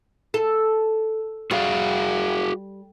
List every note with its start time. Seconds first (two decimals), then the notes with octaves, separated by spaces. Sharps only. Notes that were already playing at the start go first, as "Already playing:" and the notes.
0.34 A4
1.51 G3 F#4 G#4 F5